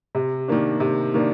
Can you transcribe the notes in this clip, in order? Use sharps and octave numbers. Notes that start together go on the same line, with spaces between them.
C3
D#3 A#3 D4
C3
D#3 A#3 D4